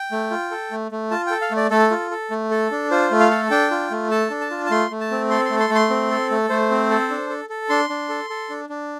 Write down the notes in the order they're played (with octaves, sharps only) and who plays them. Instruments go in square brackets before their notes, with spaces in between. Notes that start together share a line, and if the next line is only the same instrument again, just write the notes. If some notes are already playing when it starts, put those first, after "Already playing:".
Already playing: [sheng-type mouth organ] G5
A3
F4
A4
A3
A3
F4 A5
A4 G5
F5
A3
D5
A3 A4
F4
A4
A3
A4
D4
F4 C5
A3
F5
A4
D4 G5
F4
A3
A4 A5
D4
A5
F4
A5
A3 C6
A3
A5
C4
A4 C6
C6
A3
C6
A3
C6
C4
A4
A3
A3 C5
C4
A4
D4
A4
A4
D4 C6
D4
A4
A4
D4
D4